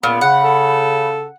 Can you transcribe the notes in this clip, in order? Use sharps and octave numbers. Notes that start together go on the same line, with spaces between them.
C#2 A#2 B3 B5
C#3 F#5
A4